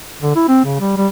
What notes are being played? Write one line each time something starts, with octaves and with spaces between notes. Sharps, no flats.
D3
E4
C4
C#3
G3
G3